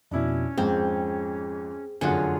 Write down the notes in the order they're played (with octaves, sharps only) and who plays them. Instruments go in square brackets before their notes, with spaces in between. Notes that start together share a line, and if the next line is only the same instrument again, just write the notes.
[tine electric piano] F2 B2 [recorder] C#4 [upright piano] D4 E4
[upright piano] F2 G#2 [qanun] C4 [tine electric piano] G#4
[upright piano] F1 F#2 [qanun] D3 F#3 G#4 [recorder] F4 [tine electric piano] F#5 G#5